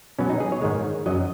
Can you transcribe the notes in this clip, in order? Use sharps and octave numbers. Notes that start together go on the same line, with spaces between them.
B2 F#3 C#4
D#4
G#4
C#5
G#2 D#3 G#3
F#2 F#3 D#5